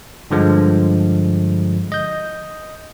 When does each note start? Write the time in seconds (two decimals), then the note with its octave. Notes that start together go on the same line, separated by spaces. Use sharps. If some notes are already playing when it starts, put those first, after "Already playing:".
0.31 G2 D3 F3 G#3
1.92 D#5 G6